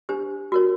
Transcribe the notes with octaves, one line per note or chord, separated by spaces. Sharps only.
D4 G4 C5
F#4 A#4 C#5